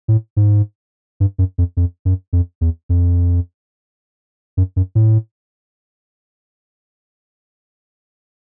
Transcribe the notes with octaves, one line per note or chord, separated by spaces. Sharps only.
A2
G#2
G2
F#2
F2
F2
F#2
F2
E2
F2
F#2
F#2
A2